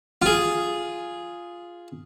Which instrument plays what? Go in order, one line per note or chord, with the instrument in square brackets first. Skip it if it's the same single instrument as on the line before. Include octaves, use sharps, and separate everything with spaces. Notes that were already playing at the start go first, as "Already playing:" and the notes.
[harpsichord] F4 G#4